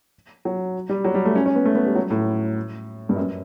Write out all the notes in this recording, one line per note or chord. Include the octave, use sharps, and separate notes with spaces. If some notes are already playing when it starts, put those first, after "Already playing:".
F#3
G3
F#3
G3
A3
C#4
C#4
B3
A3
B3
G3
F#3
A2
G2
F#2